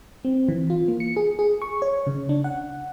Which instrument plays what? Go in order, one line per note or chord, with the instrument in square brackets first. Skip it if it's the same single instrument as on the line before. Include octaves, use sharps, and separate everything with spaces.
[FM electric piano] C4
E3
F4
A#3
C#7
G#4
G#4
C#6
C#5
C#3
D4
F#5